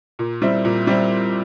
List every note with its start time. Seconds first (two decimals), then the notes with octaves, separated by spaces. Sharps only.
0.19 A#2
0.42 G3 C4 E4
0.65 A#2
0.87 G3 C4 E4